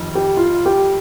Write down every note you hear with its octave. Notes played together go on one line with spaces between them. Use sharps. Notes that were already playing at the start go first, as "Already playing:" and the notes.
Already playing: F1 F2 D#3
G4
F4
G4